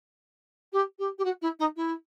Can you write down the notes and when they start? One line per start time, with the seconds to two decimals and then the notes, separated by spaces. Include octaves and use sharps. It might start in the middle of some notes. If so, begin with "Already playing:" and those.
0.73 G4
0.99 G4
1.18 G4
1.24 F#4
1.42 E4
1.59 D#4
1.76 E4